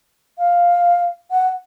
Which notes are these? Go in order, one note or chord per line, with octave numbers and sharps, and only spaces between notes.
F5
F#5